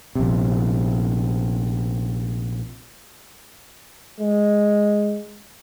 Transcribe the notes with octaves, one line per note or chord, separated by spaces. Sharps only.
A#1 C3
G#3